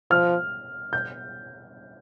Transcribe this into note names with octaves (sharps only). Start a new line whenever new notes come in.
F3 F6
G6